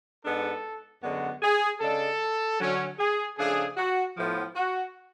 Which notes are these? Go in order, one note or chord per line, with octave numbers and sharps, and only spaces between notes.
G#2 G#3 B3 D4 A4
F#2 D3 G#3 B3 D4 F#4
G#4
C#3 G#3 D4 A4
D3 F#3 C#4
G#4
C#3 F3 A3 D4 G#4
F#4
A2 F3 B3
F#4